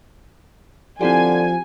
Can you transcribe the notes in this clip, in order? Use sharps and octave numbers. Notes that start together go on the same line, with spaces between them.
D3 F3 C4 E4 G4 G#5